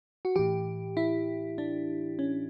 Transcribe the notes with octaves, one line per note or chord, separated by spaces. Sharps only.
F#4
A2 E3 G4
E4
D4
C#4